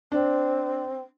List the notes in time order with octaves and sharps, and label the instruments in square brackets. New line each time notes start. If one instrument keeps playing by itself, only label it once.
[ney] C4 [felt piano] D4